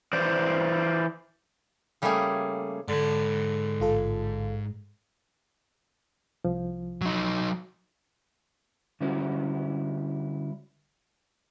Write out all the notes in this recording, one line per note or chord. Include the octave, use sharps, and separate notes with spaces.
E3 C5 D5
C#3 G3 A3 A#3 C#4 G#4
G#2 D3 A5
A1 F4 A4
C2 F3
F#3 D#4
D3 G3 C#4 E4 F#4 C5